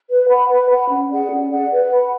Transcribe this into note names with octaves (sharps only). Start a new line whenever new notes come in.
B4
F#5 B5
B4
F#5 B5
C#4
G#4 D5 F#5
C#4
G#4 D5 F#5
B4
F#5 B5